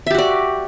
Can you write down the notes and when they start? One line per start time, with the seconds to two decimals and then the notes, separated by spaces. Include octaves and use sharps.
0.07 E5
0.11 G4
0.14 F#4
0.18 D5